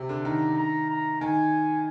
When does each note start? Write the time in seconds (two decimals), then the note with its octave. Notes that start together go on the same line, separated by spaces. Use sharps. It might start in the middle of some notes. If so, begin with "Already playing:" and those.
Already playing: C3
0.09 D3
0.25 D#3 A#5
0.57 A#5
0.89 A#5
1.21 D#3 G#5